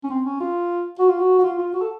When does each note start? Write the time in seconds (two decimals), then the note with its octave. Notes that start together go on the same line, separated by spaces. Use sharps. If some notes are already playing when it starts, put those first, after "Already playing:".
0.04 C#4
0.10 C4
0.25 C#4
0.40 F4
0.99 F#4
1.09 F4
1.19 F#4
1.39 F#4
1.44 F4
1.59 F4
1.74 F#4
1.81 A4